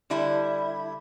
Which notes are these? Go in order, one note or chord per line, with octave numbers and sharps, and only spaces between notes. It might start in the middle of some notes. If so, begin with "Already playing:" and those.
D3 G3 E4